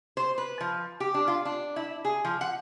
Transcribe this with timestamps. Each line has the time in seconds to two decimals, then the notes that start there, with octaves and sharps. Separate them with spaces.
0.17 C5
0.38 B4
0.61 F3
1.00 G4
1.14 D4
1.28 F4
1.45 D4
1.76 E4
2.05 G#4
2.25 F3
2.41 F#5